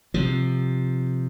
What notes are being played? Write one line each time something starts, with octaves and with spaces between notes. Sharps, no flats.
C3 F3